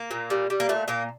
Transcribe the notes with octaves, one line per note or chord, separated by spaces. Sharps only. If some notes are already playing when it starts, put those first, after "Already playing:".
Already playing: A#3
A#2
G3
G3
A#3
A#2 A3
A#2 A#3